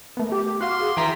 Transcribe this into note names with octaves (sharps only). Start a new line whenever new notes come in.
A3 B3 A#4
G4 D6
F#4 F5 C6
G#4
E3 E5 G5 A#5 C6 B6